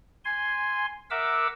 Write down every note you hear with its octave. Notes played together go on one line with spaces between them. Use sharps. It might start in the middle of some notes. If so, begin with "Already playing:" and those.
G#5 C6
A#4 E5 F#5 D6 E6